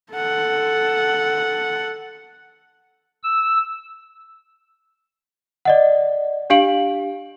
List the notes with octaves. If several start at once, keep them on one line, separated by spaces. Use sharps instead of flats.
A4 F#5
E6
D5 D#5 F#5
D4 G4 F5 D7 F#7